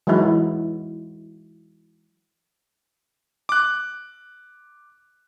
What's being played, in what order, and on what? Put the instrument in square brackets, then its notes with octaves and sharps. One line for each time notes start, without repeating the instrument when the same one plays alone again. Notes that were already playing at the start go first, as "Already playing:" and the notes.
[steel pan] E3 F#3 G#3 D#4 E4 F#4
[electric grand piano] D6 F#6